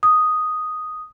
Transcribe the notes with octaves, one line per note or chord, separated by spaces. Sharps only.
D#6